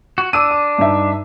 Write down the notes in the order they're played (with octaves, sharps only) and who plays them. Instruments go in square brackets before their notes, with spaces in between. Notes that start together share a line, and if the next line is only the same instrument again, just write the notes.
[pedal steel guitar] F#4
[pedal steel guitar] D4 [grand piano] D6 E6 D#7
[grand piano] D6
G2 D#4 E5